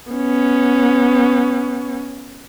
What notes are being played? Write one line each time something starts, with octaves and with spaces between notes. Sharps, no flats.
B3 C#4